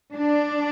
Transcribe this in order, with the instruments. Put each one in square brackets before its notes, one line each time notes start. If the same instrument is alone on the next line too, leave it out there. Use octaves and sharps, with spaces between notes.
[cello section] D4